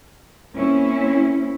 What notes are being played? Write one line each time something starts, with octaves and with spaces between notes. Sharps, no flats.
A#3 C4 C#4 E4